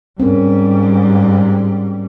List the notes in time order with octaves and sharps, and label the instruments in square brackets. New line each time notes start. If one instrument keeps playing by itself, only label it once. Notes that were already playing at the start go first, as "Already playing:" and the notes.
[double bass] G#2 G3 [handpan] C4 C#4 A#4